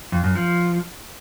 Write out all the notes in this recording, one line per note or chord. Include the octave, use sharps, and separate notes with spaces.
F2
F#2
F3